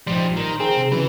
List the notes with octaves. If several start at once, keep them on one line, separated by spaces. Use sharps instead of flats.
A1 F3 G3 D#4 C6
D#3 A#5
C4 G#4
C3
C#3 E3 F#3 B4